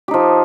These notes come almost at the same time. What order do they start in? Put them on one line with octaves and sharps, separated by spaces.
G4 D#4 F3